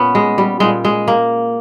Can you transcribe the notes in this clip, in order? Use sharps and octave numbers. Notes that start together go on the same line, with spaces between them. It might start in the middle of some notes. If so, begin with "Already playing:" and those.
Already playing: A#2 B3 C#4
G#3
G3
A#2 G3 G#3
G#3
A#3